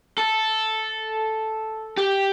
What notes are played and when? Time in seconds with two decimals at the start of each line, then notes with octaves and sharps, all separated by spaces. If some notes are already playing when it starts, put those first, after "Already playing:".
0.18 A4
1.97 G4